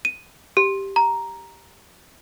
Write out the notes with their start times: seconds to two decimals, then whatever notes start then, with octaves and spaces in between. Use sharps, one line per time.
0.05 D#7
0.57 G4
0.96 A#5